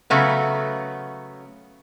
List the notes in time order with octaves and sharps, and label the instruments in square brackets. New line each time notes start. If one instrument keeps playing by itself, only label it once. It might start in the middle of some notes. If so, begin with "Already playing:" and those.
[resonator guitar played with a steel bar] C#3 F#3 A3 B3